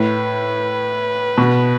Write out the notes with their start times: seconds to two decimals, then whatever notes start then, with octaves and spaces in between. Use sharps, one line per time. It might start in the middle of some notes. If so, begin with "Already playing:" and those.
Already playing: A2 B4
1.38 B2